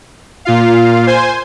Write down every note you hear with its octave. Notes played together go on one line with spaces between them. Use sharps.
A#2 F4 F5
C5 G#5 C6